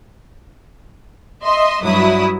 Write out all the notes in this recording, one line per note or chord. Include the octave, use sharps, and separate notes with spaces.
D#5 E5 C6
G2 F#3 E4 D#6